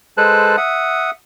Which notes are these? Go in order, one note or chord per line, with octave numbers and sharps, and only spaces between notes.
G#3 A4 B4 C5 A5 F#6
E5 F#5 D#6